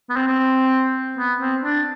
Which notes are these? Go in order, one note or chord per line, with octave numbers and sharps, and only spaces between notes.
B3
C4
C4
B3
C4
D4